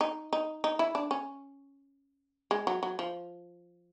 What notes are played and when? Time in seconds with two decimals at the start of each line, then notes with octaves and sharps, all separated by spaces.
0.01 D#4
0.33 D#4
0.64 D#4
0.79 E4
0.95 D4
1.11 C#4
2.51 G#3
2.67 F#3
2.83 F#3
2.99 F3